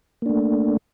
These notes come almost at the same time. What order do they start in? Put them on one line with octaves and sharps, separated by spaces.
A#3 D4 A3